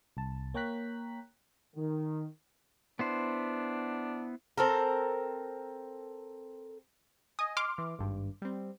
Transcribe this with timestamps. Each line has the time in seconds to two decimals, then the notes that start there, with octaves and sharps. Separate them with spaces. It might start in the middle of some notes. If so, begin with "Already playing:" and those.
0.17 C2 A5
0.54 A#3 C#5 G5 A#5 F#6 B6
1.75 D#3
2.99 B3 D4 E4 C5
4.58 C4 A4 A#4
7.39 D#5 G#5 D#6
7.57 C6 D6 F6
7.78 E3
7.99 G#1 G2
8.42 G3 C4